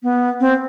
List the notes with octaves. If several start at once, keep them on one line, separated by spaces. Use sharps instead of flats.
B3
C4